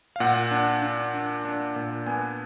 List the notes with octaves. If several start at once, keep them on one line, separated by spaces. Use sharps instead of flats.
F5
A#2 F#5
D4
D4
D4
D4
A#2
B3 G#5